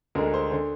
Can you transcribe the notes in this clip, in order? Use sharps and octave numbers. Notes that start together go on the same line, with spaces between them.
D2 D3 G#3 A#4
C5
D3 C5